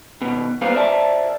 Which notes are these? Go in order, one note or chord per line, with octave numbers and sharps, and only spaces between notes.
D#2 B2
G3 A#3 B3 B4 C5 F5
A#4 C5 D5 E5 F#5 A5